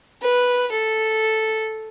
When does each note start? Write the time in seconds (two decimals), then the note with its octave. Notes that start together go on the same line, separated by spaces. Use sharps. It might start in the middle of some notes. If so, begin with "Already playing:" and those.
0.22 B4
0.72 A4